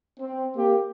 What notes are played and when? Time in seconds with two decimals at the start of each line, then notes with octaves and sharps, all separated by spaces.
0.20 C4
0.56 A#3 G4